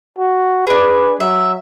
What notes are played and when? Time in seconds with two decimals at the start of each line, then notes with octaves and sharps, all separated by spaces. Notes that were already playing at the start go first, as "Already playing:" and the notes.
0.18 F#4
0.67 D4 G#4 B4
1.20 F#3 E5